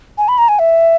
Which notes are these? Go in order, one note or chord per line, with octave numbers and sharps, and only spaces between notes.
G#5
B5
A#5
G#5
E5